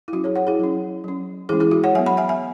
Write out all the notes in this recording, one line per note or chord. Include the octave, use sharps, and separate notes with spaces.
E4
F#3 C#4 F#4
G#4 C#5
C#5 F#5
E4 G#4
F#3 C#4
F#3 C#4
E3 G#3 C#4 E4 G#4
E4 G#4
F#4
C#5 F#5
F#3 B3 E5 G#5
F#5 B5
E5 G#5
E5 G#5